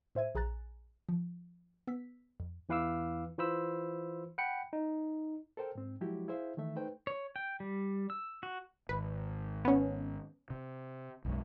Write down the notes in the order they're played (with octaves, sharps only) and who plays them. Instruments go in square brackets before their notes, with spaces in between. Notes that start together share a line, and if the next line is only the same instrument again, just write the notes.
[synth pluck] A2 C5 E5 G#6 D#7
A#1 G#4 G#5 A#5 F#6 A6
F3
B3 E6 B6
F2
[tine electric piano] E2 E3 B4 F5 D6 E6
E3 F4 C5 B5 E6
F#5 G5 B5 C#7
D#4
[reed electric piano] A4 A#4 C5 G5
G#2 C4
F3 F#3 G#3 E4 F#4 G4
E4 G#4 C5 E5 F5
D#3 E3 A3 E5
A3 D#4 B4 C5 G5
[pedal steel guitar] C#5
G5
G3
E6
F#4
[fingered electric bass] G#1 [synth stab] B4
[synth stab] B3 C#4
[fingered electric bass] C3
B1 F#2 G#3